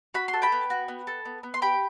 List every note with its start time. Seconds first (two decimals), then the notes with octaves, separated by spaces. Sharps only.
0.14 F#4 B5
0.28 C6
0.33 A4
0.42 G5 B5
0.52 B3
0.70 F#4
0.88 B3
1.07 A4
1.25 B3
1.43 B3
1.54 C6
1.62 G4 G5 B5